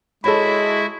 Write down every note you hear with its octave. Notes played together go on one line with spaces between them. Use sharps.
G#3 E4 F#4 A4 C#5 E5 B5